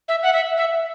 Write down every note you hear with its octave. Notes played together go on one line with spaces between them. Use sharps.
E5
F#5
E5
E5